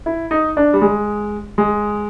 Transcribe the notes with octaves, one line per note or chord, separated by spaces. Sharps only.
E4
D#4
D4
G3
G#3
G#3